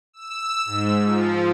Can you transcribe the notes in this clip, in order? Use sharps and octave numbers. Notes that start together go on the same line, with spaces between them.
E6
G#2
F3